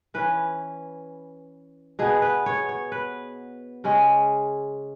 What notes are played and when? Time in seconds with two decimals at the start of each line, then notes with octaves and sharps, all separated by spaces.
0.14 E3 C#4 B4
1.99 B2 B3 G#4
2.22 B4
2.46 C#5
2.69 C#5
2.92 B4
3.84 C#3 G#3 C#4